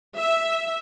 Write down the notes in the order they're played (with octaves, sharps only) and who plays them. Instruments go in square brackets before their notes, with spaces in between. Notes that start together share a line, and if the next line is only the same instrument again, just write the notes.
[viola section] E5